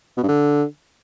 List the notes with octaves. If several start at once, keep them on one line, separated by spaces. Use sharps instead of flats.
B2
G2
D3